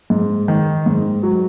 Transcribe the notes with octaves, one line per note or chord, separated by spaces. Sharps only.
G#2
D#3
G#2
F#3